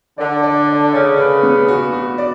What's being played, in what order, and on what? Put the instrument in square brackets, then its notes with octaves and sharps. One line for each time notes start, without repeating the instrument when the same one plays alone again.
[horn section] D3 [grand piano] D5
[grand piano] D5
D5
[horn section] C#3 [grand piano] D5
[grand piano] B4
B3
F#4
F#4
D5